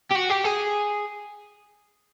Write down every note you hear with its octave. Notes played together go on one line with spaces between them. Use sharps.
G4
F#4
G4
G#4